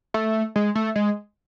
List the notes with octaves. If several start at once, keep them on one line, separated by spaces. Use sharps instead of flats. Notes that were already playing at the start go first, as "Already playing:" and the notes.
A3
G#3
A3
G#3